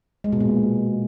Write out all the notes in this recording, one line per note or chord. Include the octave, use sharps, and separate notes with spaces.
G#3
B2
A#2